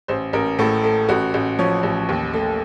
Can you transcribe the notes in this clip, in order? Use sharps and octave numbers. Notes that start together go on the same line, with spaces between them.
A1 C5
A1 A#4
A2 A4
A3
A1 F#4
A1
F3 C#5
A1
D#2
A3